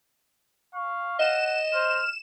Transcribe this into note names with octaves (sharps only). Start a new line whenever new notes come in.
F5 C#6
D#5 F#5 E7
C5 F6